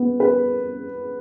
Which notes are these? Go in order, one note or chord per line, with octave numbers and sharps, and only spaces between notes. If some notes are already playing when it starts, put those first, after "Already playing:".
Already playing: B3
B4